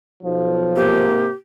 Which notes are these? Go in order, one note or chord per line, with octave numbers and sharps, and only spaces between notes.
B1 F3
G#2 C3 A#3 G4